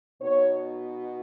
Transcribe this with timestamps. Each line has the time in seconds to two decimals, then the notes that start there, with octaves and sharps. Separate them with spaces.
0.21 B2 B3 D#4 C#5